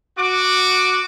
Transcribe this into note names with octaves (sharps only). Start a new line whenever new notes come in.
F#4 D6